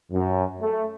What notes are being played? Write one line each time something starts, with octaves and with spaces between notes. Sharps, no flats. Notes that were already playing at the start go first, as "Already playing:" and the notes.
F#2
A3